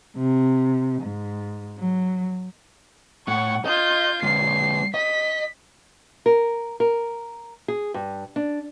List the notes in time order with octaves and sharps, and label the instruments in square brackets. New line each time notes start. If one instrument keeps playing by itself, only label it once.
[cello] C3
G#2
F#3
[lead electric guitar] A2 [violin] F#5 C#6
[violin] F4 G6 [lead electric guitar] D#5
[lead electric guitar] D3 G#3 [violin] C7
[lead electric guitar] D#5 [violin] B6
[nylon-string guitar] A#4
A#4
G#4
G2
D4